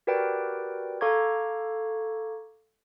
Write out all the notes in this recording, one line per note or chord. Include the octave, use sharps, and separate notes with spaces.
F#4 G4 A#4 B4 D5 G5
A4 F5 A#5 C#6 D6 G#6